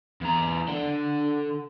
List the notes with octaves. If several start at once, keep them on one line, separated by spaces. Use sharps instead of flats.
E2 A#5
D4 A4